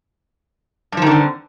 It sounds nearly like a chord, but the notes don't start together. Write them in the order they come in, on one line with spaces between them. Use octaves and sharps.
G2 F3 D#3 D3 C4